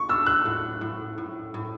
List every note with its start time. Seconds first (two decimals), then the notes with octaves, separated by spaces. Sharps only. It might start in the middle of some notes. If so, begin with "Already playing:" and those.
Already playing: D3 A3 C#6
0.09 D4 E6
0.26 F#6
0.46 A2
0.81 A2
1.18 A2
1.54 A2